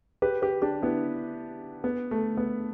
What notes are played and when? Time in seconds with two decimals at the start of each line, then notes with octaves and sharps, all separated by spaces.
0.22 G4 B4
0.42 G4 B4
0.62 D4 G4
0.82 B3 E4
1.84 B3
2.11 A3
2.37 B3